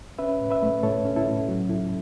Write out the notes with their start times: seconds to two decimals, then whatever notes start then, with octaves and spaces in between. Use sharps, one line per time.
0.19 C#4 B4 E5
0.40 A2
0.51 B4 E5
0.62 A3
0.83 A2 A4 C#5
1.05 C#4
1.16 E4 A4
1.27 A2
1.48 F#3 F#4
1.69 C#2 E4 A4